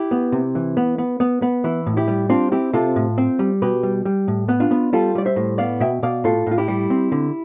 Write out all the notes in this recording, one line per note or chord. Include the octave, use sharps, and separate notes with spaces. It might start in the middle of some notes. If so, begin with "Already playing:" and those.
Already playing: E4 G4
B3
C3
E3
B3
B3
B3
B3
E3 E4
A2
E4 G4
G3
C4 D4 F4
C4 E4 G4
C3 F4 A4
A2
C4
G3
B2 G4 B4
G3
G3
A2
B3
D4 F4
B3
G3 F4 A4
G3 D5
C5 E5
A2
B3 D5 F5
B2 E5 G5
B2 D5 F5
A2 F4 A4
A2
F4
E4 G4
G3
C4
D3